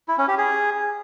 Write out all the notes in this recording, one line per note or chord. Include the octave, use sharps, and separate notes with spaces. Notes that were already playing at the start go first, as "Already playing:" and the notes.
E4
C#4
G4
G#4